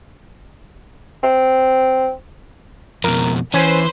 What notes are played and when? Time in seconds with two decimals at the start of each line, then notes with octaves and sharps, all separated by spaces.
1.23 C4
3.04 F2 B2 A#4
3.54 E3 C#4 B4 C5 G#5